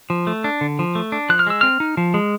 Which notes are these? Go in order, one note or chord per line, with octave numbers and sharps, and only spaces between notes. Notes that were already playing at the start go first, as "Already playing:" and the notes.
F3
A3
D4
D3
F3
A3
D4
F3 F#6
F6
G#3 E6
C4 F6
D#4
F3
G#3